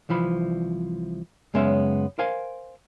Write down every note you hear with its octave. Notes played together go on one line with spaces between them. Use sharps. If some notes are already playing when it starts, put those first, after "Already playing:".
C2 E3 F3 B5
F#2 C#3 G#3 B3 C#4 E5
A#4 C5 F5 G#5